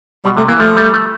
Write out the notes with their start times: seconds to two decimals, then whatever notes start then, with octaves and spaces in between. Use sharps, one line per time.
0.25 B2 G3
0.37 C3 A3
0.48 E3 A#3
0.59 F3 A3
0.76 G3
0.93 A3